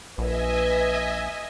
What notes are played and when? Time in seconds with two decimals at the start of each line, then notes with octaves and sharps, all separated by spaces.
0.18 A#1 B4 D#5 E5 G#5